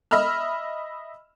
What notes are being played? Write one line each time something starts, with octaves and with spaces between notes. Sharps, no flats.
D#5 E5 B5 E6 F6